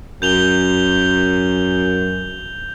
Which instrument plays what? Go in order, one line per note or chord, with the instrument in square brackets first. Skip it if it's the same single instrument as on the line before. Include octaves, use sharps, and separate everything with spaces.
[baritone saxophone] F#2 [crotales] G6 F7 G7